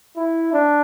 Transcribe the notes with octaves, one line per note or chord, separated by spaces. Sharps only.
E4
D4